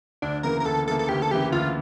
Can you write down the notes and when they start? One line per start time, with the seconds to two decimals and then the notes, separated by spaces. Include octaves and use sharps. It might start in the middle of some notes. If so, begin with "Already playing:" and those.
0.22 D2 D4
0.43 C#3 E3 A#3 A#4
0.60 A#4
0.65 D2 A4
0.87 C#3 E3 A#3 A4
0.99 A4
1.09 D2 G4
1.22 A4
1.31 C#3 E3 A#3 G4
1.52 D2 F4